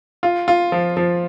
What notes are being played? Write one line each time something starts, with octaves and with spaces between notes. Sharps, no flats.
F4
F4
F3
F3